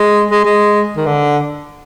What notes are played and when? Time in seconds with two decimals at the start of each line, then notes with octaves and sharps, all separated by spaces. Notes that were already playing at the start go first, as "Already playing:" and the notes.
Already playing: G#3
0.31 G#3
0.45 G#3
0.97 D#3
1.06 D3